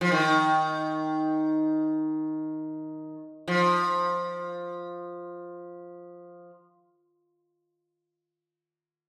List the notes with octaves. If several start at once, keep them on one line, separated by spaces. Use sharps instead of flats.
F3
D#3
F3